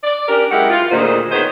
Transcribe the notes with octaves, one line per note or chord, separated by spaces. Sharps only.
D5
C#4 D4 G4 A#4
F#2 G#3 E4 G4 A#4 F#5
F4
D2 A#2 D#3 D#4 G#4 C5
D#3 B3 G#4 C5 C#5 D#5